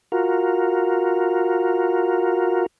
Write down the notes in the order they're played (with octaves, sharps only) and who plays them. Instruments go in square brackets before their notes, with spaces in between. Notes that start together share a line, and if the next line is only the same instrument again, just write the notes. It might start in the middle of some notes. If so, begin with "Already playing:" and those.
[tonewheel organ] F4 F#4 A#4